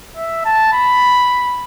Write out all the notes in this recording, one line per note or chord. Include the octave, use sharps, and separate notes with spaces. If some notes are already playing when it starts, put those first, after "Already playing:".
E5
A5
B5